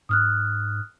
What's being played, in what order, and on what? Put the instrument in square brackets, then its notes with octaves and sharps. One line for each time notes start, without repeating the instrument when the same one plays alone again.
[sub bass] G#2 [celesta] D#6 F6 F#6